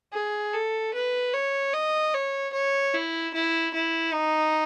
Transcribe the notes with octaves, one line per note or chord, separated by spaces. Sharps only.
G#4
A4
B4
C#5
D#5
C#5
C#5
E4
E4
E4
D#4